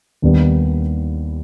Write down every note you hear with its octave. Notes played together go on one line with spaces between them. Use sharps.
D#2 D#3 G3 B3 D4